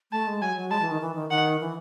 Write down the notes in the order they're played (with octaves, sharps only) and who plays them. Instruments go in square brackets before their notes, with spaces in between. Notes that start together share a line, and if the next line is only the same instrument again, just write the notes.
[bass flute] A3 [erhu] A5
[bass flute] G#3
[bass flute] F#3 [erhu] G#5
[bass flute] F#3
[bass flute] G#3 [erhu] A5
[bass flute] E3
D#3
E3
D#3
[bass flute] D#3 [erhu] F#5
[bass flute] E3